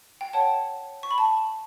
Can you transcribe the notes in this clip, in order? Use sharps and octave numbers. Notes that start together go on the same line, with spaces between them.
G5
C#5 F#5 A5
C#6
B5
A5